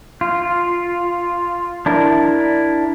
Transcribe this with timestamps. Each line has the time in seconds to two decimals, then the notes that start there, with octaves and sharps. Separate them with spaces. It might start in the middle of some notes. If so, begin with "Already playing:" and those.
0.21 F4
1.86 D4 E4 A#4